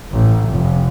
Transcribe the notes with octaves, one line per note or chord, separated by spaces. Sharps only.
A1
F1